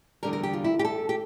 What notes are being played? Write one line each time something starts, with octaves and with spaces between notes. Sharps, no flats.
E2 D3 G3 A#4
A#4
G4
F4
E4
G4
A4
G4